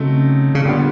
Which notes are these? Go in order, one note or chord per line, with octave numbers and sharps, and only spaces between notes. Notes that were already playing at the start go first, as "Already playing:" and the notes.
Already playing: C#3 F#3 A3 C4 D#4
C#3
A#2 D3 G3 B3